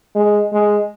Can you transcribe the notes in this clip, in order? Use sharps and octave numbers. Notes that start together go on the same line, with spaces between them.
G#3
G#3